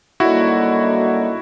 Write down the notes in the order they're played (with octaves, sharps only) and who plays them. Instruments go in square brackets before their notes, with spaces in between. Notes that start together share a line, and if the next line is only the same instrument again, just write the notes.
[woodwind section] F#2 D3 G3 A#3 D#4 [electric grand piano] E4 F#4